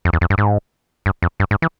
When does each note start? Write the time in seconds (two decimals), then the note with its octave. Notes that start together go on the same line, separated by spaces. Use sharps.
0.05 F2
0.13 E2
0.21 F2
0.30 G2
0.38 G#2
1.06 G2
1.22 F2
1.40 G2
1.51 G#2
1.62 E3